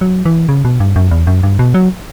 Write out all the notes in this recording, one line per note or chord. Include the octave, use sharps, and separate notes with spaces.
F#3
E3
C#3
B2
G2
F#2
E2
F#2
G2
B2
F#3